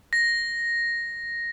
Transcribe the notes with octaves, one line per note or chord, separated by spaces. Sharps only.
A#6